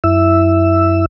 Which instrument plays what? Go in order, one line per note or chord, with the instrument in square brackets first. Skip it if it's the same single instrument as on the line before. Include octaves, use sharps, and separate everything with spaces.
[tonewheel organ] F#2 E4 E5 E6